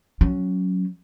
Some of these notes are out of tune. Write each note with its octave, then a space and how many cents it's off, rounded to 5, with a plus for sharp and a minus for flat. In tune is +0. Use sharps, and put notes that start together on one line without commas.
F#3 +0 C#4 +0